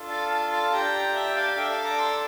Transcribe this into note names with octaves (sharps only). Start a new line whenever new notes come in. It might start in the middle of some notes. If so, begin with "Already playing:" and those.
Already playing: D4 F4 A4
F5 A5
F5 A5
F5 A5
D4 G4 G5 A#5
E5 G5
D5 F5
D4 A4 E5 G5
D5 F5
A#5 D6
C6 E6